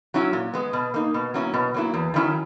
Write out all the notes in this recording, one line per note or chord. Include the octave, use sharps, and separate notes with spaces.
F#3 C#4 E4
A#2
G#3 B3
B2
A#3 D#4
B2
F#3 A#3 C#4 E4
B2
F#3 A#3 E4
E2
D#3 F#3 C#4 E4